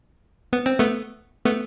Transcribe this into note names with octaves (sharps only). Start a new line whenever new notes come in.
B3
C4
A3 B3
A3 B3